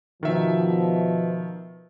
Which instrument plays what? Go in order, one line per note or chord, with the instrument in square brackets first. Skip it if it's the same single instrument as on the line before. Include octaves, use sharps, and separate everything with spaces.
[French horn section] B2 F3 [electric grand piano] D#3 E5